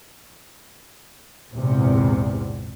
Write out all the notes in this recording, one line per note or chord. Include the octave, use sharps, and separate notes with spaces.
A#1 E2 G#2 C3